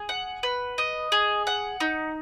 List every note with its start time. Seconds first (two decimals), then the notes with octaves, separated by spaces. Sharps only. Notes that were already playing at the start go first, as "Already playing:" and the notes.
Already playing: G#4
0.09 F#5
0.43 B4
0.78 D#5
1.12 G#4
1.47 F#5
1.80 D#4